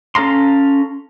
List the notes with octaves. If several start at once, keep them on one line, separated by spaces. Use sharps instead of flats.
C#4 A4 F5 A#5 C6